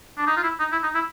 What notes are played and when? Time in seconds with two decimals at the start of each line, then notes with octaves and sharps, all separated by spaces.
0.17 D4
0.27 D#4
0.37 F4
0.43 E4
0.60 D#4
0.72 E4
0.83 D#4
0.95 E4